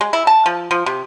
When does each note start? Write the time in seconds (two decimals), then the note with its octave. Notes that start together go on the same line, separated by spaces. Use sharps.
0.01 G#3
0.13 E4
0.27 A5
0.46 F3
0.71 F3
0.86 C3